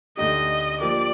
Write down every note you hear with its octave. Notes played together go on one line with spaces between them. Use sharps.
D2 D3 A3 D#4 G4 D#5
F3 A#3 D4 G4 A#4 D5